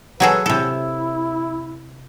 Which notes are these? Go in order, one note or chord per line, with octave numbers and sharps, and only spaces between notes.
F#3 G#4 A4 B4
C3 E4 A4